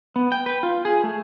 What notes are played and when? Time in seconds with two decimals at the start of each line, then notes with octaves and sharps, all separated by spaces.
0.16 B3
0.32 G5
0.46 B4
0.63 F4
0.85 G#4
1.04 A3